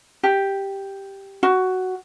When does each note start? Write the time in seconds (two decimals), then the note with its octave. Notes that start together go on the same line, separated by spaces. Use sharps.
0.23 G4
1.43 F#4